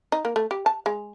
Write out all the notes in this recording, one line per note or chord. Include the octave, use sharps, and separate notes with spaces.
D#4
A#3
A3
G4
A5
G#3